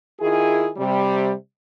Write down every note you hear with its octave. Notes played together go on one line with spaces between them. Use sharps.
D#3 E4 F4 G#4
C3 G3